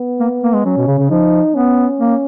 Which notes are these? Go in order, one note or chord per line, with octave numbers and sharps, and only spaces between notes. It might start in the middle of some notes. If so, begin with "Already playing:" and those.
Already playing: B3
A#3
A#3
G#3
F#3 C#4
B2
C#3
C#3
F3 D#4
B3 C#4
A#3